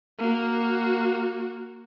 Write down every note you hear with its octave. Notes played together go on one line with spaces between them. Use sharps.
A#3 F#4